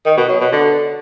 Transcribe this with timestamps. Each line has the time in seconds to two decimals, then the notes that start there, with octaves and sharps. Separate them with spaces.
0.06 D#3
0.17 B2
0.29 F#3
0.41 B2
0.52 D3